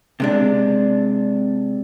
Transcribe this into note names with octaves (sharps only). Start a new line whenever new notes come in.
C3 G#3 D4